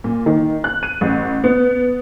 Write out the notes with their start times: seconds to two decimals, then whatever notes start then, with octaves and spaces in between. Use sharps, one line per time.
0.04 A#2
0.26 D#3
0.64 F#6
0.83 D#7
1.01 A1
1.44 B3